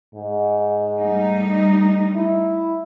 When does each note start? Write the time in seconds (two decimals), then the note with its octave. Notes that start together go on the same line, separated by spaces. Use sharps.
0.15 G#2
0.99 G3 A3 D#4
2.16 E4